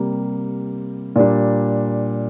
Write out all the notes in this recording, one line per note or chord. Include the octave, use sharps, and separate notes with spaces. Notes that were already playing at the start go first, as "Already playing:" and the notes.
Already playing: C3 G3 A#3
A#2 G3 D4